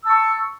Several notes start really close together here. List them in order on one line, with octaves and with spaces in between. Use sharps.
E6 A5 C#6